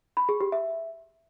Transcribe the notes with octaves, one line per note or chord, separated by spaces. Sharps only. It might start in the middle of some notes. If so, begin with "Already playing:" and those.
B5
G#4
G4
E5